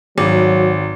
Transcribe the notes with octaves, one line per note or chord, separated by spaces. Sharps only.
G#1 F#3